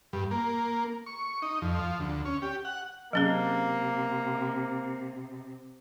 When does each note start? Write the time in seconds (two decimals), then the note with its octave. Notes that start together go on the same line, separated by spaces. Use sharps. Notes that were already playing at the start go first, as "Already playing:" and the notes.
0.13 G2
0.31 A#3
1.06 C#6
1.42 D#4
1.62 F2
1.79 F3
2.00 D2
2.25 C#4
2.42 G4
2.65 F#5
3.13 C3 F#3 A#3 C#4 G#4